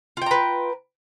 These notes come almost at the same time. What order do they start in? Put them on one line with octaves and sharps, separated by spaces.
F4 G5 A#5 B4